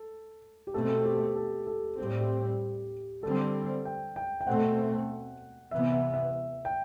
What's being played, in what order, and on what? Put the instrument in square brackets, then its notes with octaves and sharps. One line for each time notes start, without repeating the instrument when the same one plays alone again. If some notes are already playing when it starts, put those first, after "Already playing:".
Already playing: [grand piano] A4
G4
[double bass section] B2 A3 C4 [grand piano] A4
[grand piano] G4
A4
A4
[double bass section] A2 G3 C4 [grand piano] G4
[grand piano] G4
[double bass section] D3 G3 C4 [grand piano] A4
[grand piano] G5
G5
G5
[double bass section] B2 A3 C4 [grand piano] F#5
[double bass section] C3 E3 B3 [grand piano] E5
[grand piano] E5
E5
G5